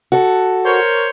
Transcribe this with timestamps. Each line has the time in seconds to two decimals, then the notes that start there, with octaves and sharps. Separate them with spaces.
0.12 F#4 A4
0.64 A#4 C5 C#5